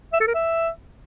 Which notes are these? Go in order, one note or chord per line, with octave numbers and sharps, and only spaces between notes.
E5
A4
A#4
E5